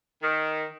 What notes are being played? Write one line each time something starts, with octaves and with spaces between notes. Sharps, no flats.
D#3